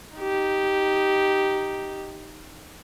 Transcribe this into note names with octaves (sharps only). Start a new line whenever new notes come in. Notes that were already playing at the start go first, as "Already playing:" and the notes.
D#4 G4